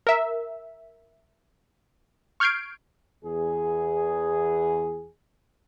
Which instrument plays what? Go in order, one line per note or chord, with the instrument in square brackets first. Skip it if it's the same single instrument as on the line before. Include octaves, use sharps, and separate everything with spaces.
[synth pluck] A#4 E5
C#6 F6 G6 G#6 C7 D7
[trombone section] E2 G#4